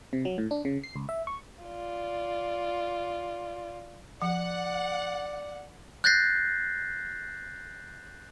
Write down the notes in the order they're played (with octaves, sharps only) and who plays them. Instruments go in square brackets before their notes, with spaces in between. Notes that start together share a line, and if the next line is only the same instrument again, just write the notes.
[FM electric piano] C3
F#3
A2
D4
C#3
C7
C#2
E5
C#6
[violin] F4 D5
[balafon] F3 [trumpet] D5 [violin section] F#5
[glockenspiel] F#6 G6 A6 A#6 C7